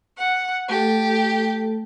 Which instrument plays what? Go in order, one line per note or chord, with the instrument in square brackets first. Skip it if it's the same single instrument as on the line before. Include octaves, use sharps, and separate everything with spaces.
[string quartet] F#5
[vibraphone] A3 A4 [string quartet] G4